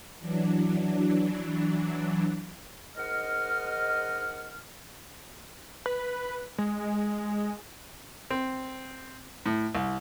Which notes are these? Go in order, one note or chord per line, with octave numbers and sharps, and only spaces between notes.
E3 F#3 D4
G#2 D#4 A#4 D#5 F#5 F6
B4
G#3
C4
A2
C2